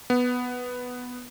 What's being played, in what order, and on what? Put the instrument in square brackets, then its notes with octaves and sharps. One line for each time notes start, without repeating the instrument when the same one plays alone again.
[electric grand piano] B3